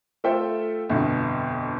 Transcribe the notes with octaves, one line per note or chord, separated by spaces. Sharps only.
A3 F4 A4 C5 E5 G5
G1 F2 B2